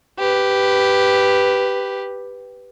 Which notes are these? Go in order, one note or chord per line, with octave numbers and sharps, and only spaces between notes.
G4 B4